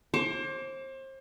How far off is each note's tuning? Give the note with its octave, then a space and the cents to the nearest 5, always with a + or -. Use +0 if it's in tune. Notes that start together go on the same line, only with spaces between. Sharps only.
C5 +35 D6 -20